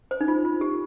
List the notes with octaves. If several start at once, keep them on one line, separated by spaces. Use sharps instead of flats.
C5
D#4
F4
F4
G4